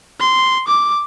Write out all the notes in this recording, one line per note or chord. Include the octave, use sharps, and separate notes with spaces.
C6
D6